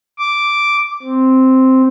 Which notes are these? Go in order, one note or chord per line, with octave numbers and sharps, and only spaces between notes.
D6
C4